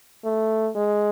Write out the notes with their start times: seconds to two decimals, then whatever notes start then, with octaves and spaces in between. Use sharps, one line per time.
0.25 A3
0.75 G#3